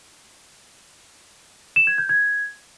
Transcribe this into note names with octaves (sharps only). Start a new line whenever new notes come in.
E7
G#6
G6
G#6